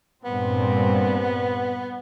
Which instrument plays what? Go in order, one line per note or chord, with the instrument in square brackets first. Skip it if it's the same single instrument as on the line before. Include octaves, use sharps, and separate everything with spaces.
[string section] G2 A#2 C4 [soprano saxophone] B3